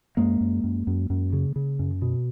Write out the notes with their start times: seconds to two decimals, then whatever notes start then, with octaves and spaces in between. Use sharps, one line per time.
0.17 F#2 G#3 A#3
0.41 F#2
0.64 F#2
0.87 F#2
1.10 F#2
1.33 C#3
1.56 C#3
1.79 F#2
2.02 B2